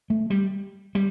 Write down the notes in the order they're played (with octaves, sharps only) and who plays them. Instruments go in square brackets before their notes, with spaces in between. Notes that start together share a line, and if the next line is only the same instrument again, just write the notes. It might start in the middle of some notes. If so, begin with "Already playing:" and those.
[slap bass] A3
G3
G3